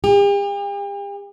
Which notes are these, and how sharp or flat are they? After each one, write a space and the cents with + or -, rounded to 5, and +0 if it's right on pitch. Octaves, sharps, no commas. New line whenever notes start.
G4 +45